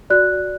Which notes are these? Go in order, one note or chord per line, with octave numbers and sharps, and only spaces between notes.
F#4 D5 F#6